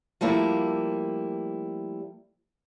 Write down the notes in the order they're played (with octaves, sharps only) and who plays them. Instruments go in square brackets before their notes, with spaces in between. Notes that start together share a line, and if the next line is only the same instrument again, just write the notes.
[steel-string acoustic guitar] F3 G3 A3 A#3 E4